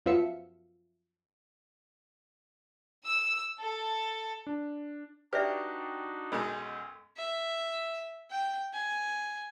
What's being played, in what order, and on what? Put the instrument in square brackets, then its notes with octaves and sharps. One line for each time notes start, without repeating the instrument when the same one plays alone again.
[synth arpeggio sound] F#2 F3 B3 E5 F5 C#7
[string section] E6
A4
[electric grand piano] D4
[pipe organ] D4 D#4 F#4 [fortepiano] G4 [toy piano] B4 D5 E5
[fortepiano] B1 F#2 G#3
[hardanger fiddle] E5
G5
G#5